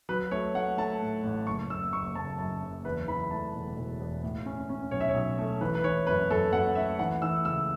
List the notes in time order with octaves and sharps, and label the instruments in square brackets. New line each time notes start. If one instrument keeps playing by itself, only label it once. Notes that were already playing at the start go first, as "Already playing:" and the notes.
[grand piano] F#3 B4
A3 C#5
A3 F#5
A3 A5
A2
A1
F#1 C#6
F#1 E6
F#1 C#6
F#1 A5
F#2 A5
F#1
E2 B4
E3 B5
A3 A5
E1
E1
E2
A2
C#4
C#4
B1 C#5
E5
C#5
B1
A3
E3 B4
B4
E3 C#5
F#2 B4
F#2 A4
F#2 F#5
A3 E5
E3 F#5
E3 E6
C#2 E6